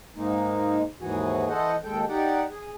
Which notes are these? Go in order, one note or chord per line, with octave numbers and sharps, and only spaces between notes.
G#2 G#3 A#3 D#4
D#2 G#2 E3 F#4 G#4
E3 A4 C5 D#5 F#5
D#2 G#3 A4 G5
D#4 G4 D5 F#5 G5
G#4